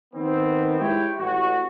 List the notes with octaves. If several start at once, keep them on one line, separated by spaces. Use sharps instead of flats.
D#3 B3 C4
G#3 E4 G4 C#5 G5
A1 F#4